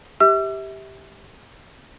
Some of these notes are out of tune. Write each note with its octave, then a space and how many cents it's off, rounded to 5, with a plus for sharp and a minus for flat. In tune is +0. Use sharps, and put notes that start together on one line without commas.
G4 +0 E5 -25 E6 +45